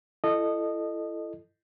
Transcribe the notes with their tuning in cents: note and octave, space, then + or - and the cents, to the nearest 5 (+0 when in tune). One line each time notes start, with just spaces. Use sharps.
E4 +30 A4 +0 D#5 -20